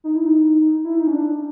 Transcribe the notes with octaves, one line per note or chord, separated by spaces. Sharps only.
D#4
E4
D#4
E4
D#4
C#4
D4